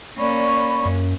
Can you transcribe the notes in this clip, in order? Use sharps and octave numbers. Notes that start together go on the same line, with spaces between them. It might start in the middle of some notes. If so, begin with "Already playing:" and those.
A#3 C#4 D5 B5 C#6
F#2